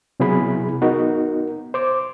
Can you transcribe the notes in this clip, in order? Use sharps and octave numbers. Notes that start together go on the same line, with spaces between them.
C3 F#3 B3 E4 G#4 B5
B3 D#4 F#4 A#4
C5 D6